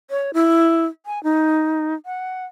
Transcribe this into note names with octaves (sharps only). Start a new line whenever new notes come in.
C#5
E4
G#5
D#4
F#5